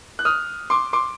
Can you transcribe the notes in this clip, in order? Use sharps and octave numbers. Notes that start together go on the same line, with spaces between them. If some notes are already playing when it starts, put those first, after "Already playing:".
F#6
D#6 F6
C6 D6
C6 D6